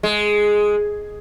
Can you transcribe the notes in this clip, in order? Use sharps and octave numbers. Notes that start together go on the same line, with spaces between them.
G#3